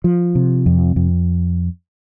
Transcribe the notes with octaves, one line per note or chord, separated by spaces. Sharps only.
F3
C3
F2
F2